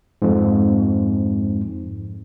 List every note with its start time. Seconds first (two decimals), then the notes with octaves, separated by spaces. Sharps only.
0.22 F2 G#2